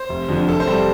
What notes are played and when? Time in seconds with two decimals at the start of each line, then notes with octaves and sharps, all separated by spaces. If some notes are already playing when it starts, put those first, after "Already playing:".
Already playing: C5
0.09 F1
0.28 F2 D3 F3
0.48 F1 A4
0.60 C5
0.68 C3 G3 A4